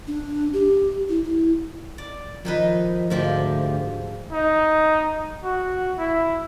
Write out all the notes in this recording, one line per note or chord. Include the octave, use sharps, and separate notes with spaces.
D4
G4
E4
E4
D5
D#3 F3 D#4 B4
D2 G#2 F3 G4
D#4
F#4
E4